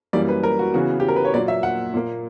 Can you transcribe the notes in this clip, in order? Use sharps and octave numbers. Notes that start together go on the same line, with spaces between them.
F#2 E3 G3 A#3 D5
B4
A#4
F#4
C#3 E3 B3 F#4
G4
A#4
B4
C#5
A#2 F#3 A#3 D5
E5
F#5
A#2 A#3